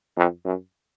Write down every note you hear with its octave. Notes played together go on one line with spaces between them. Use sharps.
F2
F#2